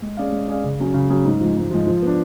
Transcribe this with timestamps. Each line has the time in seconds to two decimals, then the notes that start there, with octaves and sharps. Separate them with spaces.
0.02 G#3
0.17 C#4 G#4 D5 F5
0.32 G#3
0.48 C#4 G#4 D5 F5
0.64 C#3
0.80 F#3 C#4 G#4
0.94 C#3
1.10 F#3 C#4 G#4
1.25 G#2
1.41 F3 G#3
1.57 G#2
1.71 F3 G#3
1.87 F3
2.02 B3 D4